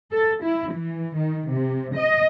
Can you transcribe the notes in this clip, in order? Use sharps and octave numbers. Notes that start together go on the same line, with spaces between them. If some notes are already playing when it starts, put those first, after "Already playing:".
A4
E4
E3
D#3
C3
D#5